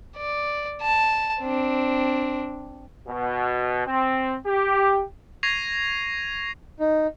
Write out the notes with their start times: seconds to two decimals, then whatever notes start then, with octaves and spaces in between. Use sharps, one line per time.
0.17 D5
0.82 A5
1.41 C4 D4
3.08 B2
3.87 C4
4.47 G4
5.43 C#6 G#6 A#6 C7 D#7 F7
6.80 D#4